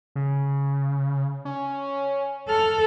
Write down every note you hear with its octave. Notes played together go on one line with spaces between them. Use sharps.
C#3
C#4
A4 F6